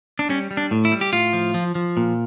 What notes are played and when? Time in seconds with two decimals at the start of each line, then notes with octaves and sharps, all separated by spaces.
0.19 D4
0.29 G3 C#4
0.51 G3
0.57 D4
0.71 A2
0.85 E4
0.92 G3
1.01 G4
1.13 A2 F4
1.33 F3
1.54 F3
1.75 F3
1.97 A#2